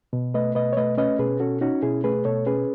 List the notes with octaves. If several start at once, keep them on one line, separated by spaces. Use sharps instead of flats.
B2
A3 B4 D#5
B2 B4 D#5
C#5
A3 B4 D#5
C#4 B4 D#5
B2 G#4 B4
C#4 F#4 A4
C#4 D#4 F#4
B2 E4 G#4
A3 G#4 B4
B2 A4 C#5
C#4 G#4 B4